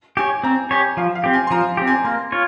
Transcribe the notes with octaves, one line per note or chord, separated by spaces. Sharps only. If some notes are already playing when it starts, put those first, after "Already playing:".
G4 C#5 G#5
C4 A#5
G4 C#5 G#5
F3 F5
F5
C4 G4
G#5
C6
F3 A#5
C4 G4
G#5
A#3 C6
F4 C#5